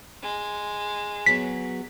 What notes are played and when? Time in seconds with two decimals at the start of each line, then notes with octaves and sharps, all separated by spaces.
0.22 G#3
1.26 F#3 B3 G#4 B6